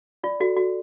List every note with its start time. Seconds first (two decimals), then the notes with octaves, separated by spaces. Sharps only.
0.24 F4 D5
0.40 F#4 A4
0.57 F#4 A4